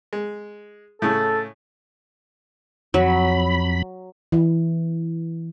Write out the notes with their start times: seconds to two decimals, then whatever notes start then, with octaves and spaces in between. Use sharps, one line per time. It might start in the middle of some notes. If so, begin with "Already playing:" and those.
0.13 G#3
1.02 A2 C#3 A4
2.94 F2 F#3 B5
4.32 E3